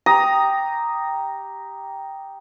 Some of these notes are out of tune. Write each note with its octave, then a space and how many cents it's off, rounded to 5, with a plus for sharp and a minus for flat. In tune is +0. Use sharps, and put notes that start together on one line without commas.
G4 +0 A#5 +0 D#6 +0